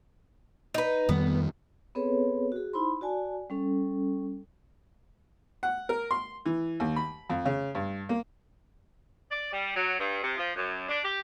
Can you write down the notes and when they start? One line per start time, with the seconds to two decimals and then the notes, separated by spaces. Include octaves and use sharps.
0.74 D#4 B4
1.09 F2 D#3 G3 B3
1.95 B3 C4 G#4 A4 B4 C#5
2.52 F#4 G#4
2.73 D#4 E4 C5 B5 C6
3.01 F#4 D5 G#5 A5
3.50 G3 C#4 A4
5.63 F#5
5.89 A#4
6.11 C6
6.46 E3
6.80 D#2
6.96 B5
7.30 F2
7.45 C#3
7.75 G2
8.09 A#3
9.31 D5
9.52 G3
9.76 F#3
9.99 G2
10.23 C3
10.38 F3
10.56 F#2
10.89 D4
11.04 G4